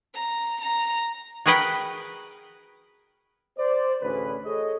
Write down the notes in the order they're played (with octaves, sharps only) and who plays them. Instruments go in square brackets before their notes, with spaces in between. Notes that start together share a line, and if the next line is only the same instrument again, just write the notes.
[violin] A#5
A#5
[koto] F#4 G#4 A#4 B4 F#5 G5
[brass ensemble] C5 D5
A1 D2 C#4 G#4 B4
G#4 A4 C#5 D#5